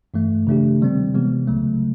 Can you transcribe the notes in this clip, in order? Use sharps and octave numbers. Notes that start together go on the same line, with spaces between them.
G2 E3 A3
C#3 E3 A3 D4 G4
C3 D#3 G3 C4
C3 E3 G#3 B3
C#2 C#3 F#3 A3